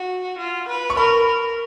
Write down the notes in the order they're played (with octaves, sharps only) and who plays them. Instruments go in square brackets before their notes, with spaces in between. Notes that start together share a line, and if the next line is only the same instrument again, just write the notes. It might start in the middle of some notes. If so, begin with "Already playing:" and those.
Already playing: [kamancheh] F#4
F4
B4
[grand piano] C#6
[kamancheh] A#4 [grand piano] B5
[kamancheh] A#4